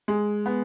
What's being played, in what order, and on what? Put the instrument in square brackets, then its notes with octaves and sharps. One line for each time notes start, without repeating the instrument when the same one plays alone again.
[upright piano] G#3
B3